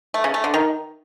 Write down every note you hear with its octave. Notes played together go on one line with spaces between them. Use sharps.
A3
C#3
A3
D3
D#3